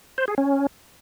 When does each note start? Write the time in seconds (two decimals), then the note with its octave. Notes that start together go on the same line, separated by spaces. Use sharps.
0.18 C5
0.28 G#4
0.38 C#4